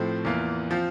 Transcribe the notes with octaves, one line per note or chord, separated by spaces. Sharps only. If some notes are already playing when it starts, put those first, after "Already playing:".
Already playing: A2 F3 A3 C4
E2 E3 A#3 F4
F3 C4 F4